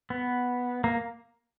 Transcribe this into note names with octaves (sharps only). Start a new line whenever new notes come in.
B3
A#3